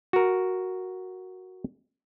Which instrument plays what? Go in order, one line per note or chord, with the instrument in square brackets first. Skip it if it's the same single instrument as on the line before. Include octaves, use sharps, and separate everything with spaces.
[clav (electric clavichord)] F#4 A#4